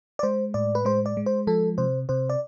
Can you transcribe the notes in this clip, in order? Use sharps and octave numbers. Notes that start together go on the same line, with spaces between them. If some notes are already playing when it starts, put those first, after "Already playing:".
D5
G#3 C5
A2 D5
B4
G#3 C5
D5
G#3
C5
F3 A4
C3 C5
C3 C5
D5